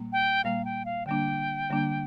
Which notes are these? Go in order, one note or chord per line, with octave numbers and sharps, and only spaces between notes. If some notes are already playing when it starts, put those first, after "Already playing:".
Already playing: A#2 G3 A#3
G5
A#2 G3 A#3 F5
G5
F5
D3 G3 A#3 D4 G5
D3 G3 A#3 D4